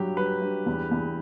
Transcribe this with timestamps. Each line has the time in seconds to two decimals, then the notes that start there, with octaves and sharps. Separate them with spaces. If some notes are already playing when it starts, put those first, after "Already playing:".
Already playing: G2 F#3 G4
0.17 G2 B4
0.42 G2
0.66 E2
0.91 E2